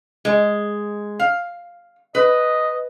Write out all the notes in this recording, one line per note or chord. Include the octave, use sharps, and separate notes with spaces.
G#3
F5
B4 D#5